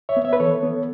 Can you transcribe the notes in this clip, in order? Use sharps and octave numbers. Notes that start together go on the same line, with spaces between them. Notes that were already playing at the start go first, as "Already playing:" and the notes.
C#5 E5
B3
C#5 E5
B4
E3 A4 C#5
B3